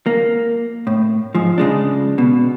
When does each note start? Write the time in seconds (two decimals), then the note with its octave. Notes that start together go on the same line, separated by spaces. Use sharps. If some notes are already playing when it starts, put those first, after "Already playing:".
0.06 A#3
0.87 A2
1.35 G#2 F3
1.58 C#3 G#3 D4
2.18 B2